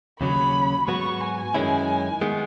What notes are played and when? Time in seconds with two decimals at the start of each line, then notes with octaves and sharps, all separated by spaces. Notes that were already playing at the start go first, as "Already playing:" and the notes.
0.20 D#2 C#3 F#3 C#4 B5
0.88 G#2 F#3 B3 F#4 C#6
1.21 G#5
1.54 F#2 D#3 G#3 C#4 E4
2.21 D#3 G#3 B3